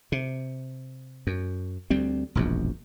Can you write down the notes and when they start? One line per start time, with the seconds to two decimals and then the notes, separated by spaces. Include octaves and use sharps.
0.12 C3
1.27 F#2
1.90 D2 G3 C4
2.35 E1 A#1 F#2